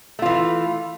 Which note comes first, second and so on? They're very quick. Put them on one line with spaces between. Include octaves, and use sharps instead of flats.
A3 F4 E3